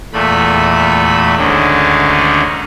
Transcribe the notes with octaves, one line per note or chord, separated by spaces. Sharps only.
E2 A#2 A3 B5
D2 G#2 D3 D#3 C#4